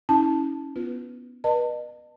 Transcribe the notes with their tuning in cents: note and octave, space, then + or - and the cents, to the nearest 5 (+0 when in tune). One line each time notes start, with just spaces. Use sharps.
C#4 +0 E4 -40 A5 +0
B3 +0 F4 +0 B4 +0
B4 -35 D#5 -40 A5 +30